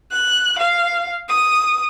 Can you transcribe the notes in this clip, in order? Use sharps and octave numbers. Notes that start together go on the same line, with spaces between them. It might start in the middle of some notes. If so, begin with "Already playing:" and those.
F#6
F5
D#6